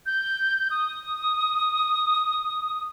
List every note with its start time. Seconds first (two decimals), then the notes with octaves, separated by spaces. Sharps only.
0.06 G6
0.71 D#6